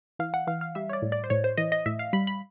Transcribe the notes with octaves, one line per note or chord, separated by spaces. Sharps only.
E3 F5
F#5
E3 F5
F5
G3 E5
C#5
D5
A2
D5
C5
A2 C#5
C5
E3 D#5
D#5
A2 E5
F5
G3 B5
B5